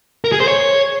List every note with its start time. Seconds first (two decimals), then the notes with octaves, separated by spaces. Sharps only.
0.24 A#4
0.32 G#4
0.40 C5
0.48 C#5